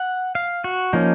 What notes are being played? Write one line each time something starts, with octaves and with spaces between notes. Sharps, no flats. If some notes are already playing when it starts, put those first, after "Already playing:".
Already playing: F#5
F5
F#4
F3 A#3 C#4 D#4